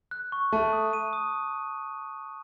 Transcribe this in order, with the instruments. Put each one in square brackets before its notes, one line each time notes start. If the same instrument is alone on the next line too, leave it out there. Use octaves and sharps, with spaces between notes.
[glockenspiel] F#6
C#6
[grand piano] A3 [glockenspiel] A5
[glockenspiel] D#6
D#7
D#6